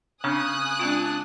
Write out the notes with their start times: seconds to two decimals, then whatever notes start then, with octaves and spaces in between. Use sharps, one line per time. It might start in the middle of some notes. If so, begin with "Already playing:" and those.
0.24 C#3 C4 D4 C#5 G#5 D#6 F#6
0.79 G#3 C4 D4 F4 A5